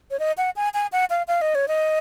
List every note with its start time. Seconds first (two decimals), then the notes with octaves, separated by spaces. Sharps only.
0.11 C#5
0.19 D#5
0.38 F#5
0.56 G#5
0.74 G#5
0.92 F#5
1.10 F5
1.28 F5
1.42 D#5
1.55 C#5
1.68 D#5